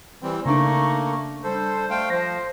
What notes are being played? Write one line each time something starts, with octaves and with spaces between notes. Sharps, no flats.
E3 G3 C4
C#3 A3 A#3 D4 D#4 A#5 C#6
G3 A4 C5
A3 F5 G5
F3 C5 A#6